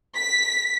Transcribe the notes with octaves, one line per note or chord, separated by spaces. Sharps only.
B6